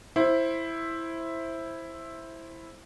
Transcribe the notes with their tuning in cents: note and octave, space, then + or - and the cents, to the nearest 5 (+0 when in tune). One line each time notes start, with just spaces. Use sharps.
E4 +0 C5 +15